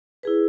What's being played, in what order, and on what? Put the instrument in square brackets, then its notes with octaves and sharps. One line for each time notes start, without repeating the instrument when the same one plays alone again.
[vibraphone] E4 G#4 B4